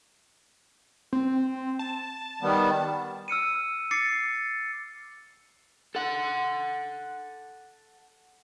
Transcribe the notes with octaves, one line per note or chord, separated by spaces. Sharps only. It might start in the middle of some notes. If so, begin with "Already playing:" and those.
C4
A5
D#3 G3 B3
E6 F6 C#7 D#7
D6 A6 C7 C#7
A4 F#5